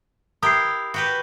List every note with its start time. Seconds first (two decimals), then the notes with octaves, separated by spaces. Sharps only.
0.43 E4 G4 A#4 D#6 C7
0.94 F#4 G4 B4